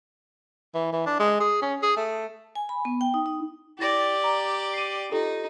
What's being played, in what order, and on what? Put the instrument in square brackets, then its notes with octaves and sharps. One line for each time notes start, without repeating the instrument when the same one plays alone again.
[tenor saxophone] E3
E3
D4
G#3
G#4
C#4
G#4
A3
[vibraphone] G#5
B5
B3
G5
D#4
D#4
[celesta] E4 A6 A#6 [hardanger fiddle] G4 D5
[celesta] A#5
C7 D#7
[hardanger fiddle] D#4 [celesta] F4 G4 A4